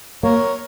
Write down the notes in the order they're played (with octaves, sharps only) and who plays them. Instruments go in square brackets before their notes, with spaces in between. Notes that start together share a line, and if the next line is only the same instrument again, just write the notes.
[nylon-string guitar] A#3 [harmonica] A#4 C#5